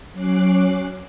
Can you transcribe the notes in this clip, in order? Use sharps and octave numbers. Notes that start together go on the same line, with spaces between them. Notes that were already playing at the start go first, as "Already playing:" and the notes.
F#3 C#4 D6 F#6 C7